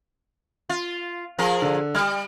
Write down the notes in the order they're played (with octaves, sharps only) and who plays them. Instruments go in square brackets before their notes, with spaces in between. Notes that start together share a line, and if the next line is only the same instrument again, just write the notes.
[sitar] F4
F3 G#4 A#4
[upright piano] D3
[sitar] G3 [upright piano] F6